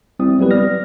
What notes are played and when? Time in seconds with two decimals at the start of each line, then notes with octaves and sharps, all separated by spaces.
0.19 G3 C4 E4 D#6
0.38 F#3 G3 B3 G4 B4
0.51 D5 F6 A#6